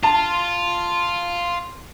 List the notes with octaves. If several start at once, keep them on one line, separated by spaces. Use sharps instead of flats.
F4 A5